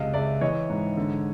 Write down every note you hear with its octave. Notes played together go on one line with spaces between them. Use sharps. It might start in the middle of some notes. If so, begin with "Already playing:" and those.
Already playing: C#2 C3 D#5 F5
C#2 D5 E5
E3 C#5 D#5
G#2
D3